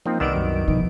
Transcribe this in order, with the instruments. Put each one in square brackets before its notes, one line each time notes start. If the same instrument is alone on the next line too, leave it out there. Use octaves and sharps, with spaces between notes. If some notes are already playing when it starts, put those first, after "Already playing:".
[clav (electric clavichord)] F3 C4 [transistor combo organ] A#3 D#4
[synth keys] C2 D7 [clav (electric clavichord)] D#3 B3 D5 [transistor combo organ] E6
[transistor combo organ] F#2
[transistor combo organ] B2 D#4 [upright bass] F3